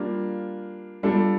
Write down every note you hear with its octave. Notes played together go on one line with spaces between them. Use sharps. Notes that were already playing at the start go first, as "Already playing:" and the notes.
Already playing: G3 A#3 D4 F4
G3 D4 F4 A4